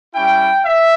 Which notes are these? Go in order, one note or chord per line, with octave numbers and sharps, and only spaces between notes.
G3 C#4 E4 G5
E5